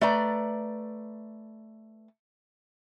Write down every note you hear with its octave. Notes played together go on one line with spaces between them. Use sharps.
A3 B4 D5 A#5